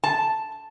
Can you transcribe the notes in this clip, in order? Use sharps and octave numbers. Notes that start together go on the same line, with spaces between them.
A5